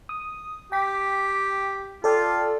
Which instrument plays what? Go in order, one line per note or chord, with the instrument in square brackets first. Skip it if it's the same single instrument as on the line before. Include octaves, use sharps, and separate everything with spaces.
[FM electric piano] D#6
[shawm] G4 [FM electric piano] G5 B6
[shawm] F4 [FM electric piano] A4 D5 G5